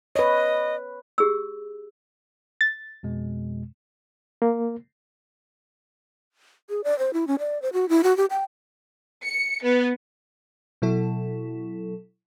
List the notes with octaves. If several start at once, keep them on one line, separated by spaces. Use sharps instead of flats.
B4 C#5 D#5
G4 G#4 E6
A6
F2 B2 G#3
A#3
G#4
D5
C5
E4
C#4
D5
C5
F#4
E4
F#4
G4
G5
C#7
B3
B2 F#3 E4 A4